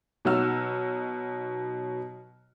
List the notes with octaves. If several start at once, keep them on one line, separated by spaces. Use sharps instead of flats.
B2 F#3 D#4 F#5 E6 F6